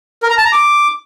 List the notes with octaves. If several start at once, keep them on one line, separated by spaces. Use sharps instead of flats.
A#4
A#5
A5
A#5
D6